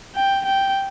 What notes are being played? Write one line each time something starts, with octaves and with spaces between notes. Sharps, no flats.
G5
G5